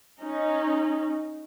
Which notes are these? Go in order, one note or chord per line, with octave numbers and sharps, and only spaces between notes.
C#4 D#4